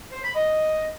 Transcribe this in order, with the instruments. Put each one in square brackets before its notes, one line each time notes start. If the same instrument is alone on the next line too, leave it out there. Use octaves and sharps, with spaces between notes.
[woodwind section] C5
B5
D#5